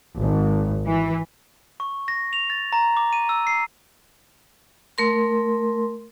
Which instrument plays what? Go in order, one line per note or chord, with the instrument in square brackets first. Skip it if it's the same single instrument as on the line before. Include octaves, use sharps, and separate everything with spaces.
[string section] G#1
E3
[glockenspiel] C#6
A#6
F7
A6
A#5
D6
D#7
E6
C7
[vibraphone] A3 A#4 C6